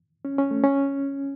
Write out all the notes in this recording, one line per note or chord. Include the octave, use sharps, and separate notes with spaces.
C#4
C#4
A3
C#4